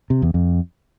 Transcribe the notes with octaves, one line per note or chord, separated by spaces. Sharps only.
C3
E2
F2